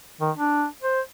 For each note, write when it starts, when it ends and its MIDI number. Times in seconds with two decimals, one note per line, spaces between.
0.20 0.31 51
0.37 0.65 62
0.83 1.00 72